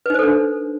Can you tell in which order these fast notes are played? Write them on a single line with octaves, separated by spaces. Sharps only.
B4 D#4 C5 A4 D4